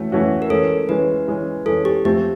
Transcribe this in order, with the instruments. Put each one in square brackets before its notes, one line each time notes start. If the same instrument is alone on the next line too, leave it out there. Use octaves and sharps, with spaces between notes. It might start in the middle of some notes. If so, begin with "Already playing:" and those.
Already playing: [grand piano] E3 A3 C#4 F#4
E3 A3 C#4 F#4
[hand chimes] A#4
[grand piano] E3 G#3 C#4 [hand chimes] A4
[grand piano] E3 G#3 C#4 [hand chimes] B4
[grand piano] E3 G#3 C#4
[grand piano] E3 G#3 C#4 [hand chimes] A4
[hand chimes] G4
[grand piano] F3 A3 C4 [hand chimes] G4